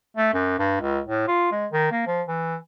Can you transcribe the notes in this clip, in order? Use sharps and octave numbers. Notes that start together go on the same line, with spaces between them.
A3
F#2
G2
C#2
A2
F4
G#3
D#3
A#3
F3
E3